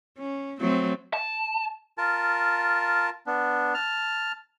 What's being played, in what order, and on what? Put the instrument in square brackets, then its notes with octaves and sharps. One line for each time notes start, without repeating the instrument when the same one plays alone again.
[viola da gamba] C#4
F#3 A3 C4
[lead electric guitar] A5
[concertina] F4 A#4 A5
B3 D4
A5 F6